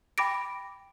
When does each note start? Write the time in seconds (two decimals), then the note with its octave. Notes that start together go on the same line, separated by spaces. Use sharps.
0.18 G5 B5 D6 A#6 D7